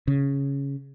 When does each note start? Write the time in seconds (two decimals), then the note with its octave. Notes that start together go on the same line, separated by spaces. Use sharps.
0.07 C#3